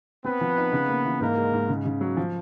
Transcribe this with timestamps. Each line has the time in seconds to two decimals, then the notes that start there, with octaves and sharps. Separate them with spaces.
0.25 B3 C4 B4
0.41 F3
0.57 D#4
0.73 C#3
0.89 A#3
1.05 E3
1.21 G#2 A#3 A#4
1.37 G#3
1.53 G#2
1.69 C#3
1.85 C#3
2.01 F#3
2.17 F3